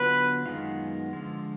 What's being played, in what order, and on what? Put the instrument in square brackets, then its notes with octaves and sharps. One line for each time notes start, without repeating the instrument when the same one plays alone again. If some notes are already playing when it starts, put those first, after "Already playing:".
Already playing: [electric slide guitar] D3 F#3 B3 D4 F4 [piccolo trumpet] B4
[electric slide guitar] F#2 D#3 G#3 B3 F4
D3 F3 G#3